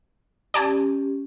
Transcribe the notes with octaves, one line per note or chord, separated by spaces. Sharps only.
C#4 G4 D5 G#5 A5